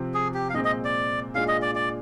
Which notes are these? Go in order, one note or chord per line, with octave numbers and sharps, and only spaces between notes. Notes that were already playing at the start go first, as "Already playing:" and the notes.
Already playing: C3 F3 C4 G4
G#4
G4
F5
A#2 G#3 C4 D#5
D#5
D5
A#2 G#3 D4 F4 G#4 F5
D#5
D5
D5